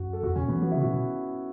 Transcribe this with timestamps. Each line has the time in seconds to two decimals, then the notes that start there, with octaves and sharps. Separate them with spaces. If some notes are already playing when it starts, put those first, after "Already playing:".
Already playing: F#2 F#4
0.13 A4
0.23 E2 F#4
0.36 B2 C#4
0.48 E3 B3
0.62 E3 F#4
0.71 C#3 E4
0.81 A2 F#4
0.87 B2